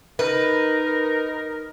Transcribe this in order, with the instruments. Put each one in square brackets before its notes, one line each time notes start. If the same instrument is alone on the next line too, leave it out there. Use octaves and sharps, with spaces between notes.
[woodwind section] D#4 A#4 [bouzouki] B4